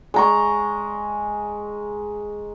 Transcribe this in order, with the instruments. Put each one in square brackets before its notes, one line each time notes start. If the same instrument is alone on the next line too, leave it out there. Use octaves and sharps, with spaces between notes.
[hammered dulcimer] G#3 A#5 C#6